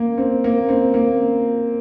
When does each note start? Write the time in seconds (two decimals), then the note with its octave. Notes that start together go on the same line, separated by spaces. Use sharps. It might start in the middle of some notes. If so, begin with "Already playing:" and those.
Already playing: A#3
0.18 C4
0.44 A#3
0.69 C4
0.94 A#3